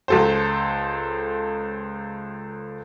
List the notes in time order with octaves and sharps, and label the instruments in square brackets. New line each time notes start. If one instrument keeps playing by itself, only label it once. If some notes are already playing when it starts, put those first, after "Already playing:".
[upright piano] C#2 A4 C5